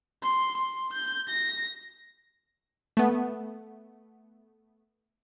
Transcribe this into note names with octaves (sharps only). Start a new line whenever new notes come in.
C6
C6
G6
A#6
A3 B3